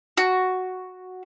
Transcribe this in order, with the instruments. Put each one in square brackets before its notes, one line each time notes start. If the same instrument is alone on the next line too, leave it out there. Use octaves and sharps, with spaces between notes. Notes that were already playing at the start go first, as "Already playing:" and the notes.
[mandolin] F#4